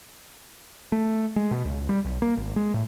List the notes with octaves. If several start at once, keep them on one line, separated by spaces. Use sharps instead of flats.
A3
G#3
B2
C#2
G3
B1
A#3
G#1
G#3
A2